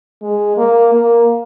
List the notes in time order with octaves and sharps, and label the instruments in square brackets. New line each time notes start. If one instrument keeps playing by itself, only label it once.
[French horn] G#3
A#3
A#3